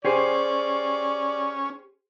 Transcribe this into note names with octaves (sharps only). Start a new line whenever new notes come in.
C#4 G4 G#4 C5 D5